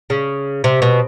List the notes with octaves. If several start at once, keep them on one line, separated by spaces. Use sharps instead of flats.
C#3
C3
B2